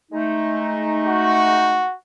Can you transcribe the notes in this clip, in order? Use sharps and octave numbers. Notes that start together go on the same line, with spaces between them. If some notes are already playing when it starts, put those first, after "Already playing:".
G#3 A3 D#4
F#4